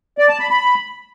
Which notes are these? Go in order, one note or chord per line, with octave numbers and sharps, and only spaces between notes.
D5
A5
B5
B5